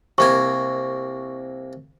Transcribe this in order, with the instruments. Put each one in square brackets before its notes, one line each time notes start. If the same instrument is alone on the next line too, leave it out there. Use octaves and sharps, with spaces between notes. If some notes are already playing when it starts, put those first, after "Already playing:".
[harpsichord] C2 A#3 G#5 [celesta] C#6